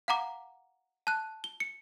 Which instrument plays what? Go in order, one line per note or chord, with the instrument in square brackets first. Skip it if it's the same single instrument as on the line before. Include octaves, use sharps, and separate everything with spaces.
[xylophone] F5 F#5 A#5 D6
A5 F#6
G7
C#7